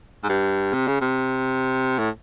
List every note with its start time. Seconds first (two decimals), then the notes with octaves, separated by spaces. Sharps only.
0.24 G#2
0.29 G2
0.73 C3
0.88 C#3
1.01 C3
1.99 A2